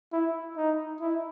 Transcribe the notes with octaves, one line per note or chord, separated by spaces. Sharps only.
E4
D#4
E4